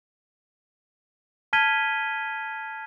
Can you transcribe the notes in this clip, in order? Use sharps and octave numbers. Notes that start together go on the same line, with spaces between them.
A5 F6 G#6 B6 D#7 G7